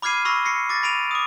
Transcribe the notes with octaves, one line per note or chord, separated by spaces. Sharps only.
B5 D6 F6 G#6 C7 D#7
B5 C#6 E6 A#6
A#6 C7 C#7
D6 A6 A#6
B5 D7 D#7 F7
D6 D#6